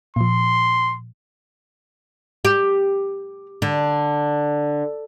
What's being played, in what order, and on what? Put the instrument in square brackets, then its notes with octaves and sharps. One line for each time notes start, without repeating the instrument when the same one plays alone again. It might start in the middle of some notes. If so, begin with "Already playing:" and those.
[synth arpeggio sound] A#2 F3 [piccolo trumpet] C6
[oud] G4
D3